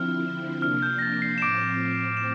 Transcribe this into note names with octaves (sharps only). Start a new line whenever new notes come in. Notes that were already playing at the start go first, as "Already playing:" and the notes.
Already playing: D3 F3 C4 E4 F6
C3 F3 A#3 D4 F6
G6
A#6
A6
C7
E7
A2 F3 C4 D6 D7
E7